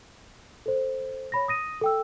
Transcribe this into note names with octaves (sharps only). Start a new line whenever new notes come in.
A4 C5
C#5 B5 A#6
D#6 A#6 D#7
A4 G5 E6